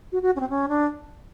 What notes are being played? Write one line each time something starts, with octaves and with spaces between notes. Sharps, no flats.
F#4
F#4
C#4
C4
C#4
D4